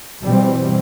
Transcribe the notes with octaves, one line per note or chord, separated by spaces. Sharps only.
B2 E3 G3 C4